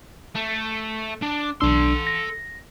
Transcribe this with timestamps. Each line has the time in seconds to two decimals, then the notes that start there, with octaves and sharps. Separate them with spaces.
0.36 A3
1.22 D4
1.61 B1 D4 A4 C6 E6
2.07 A#6